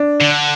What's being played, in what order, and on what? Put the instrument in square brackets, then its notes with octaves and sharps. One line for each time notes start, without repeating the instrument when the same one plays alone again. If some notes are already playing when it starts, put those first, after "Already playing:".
Already playing: [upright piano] D4
[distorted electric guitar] D3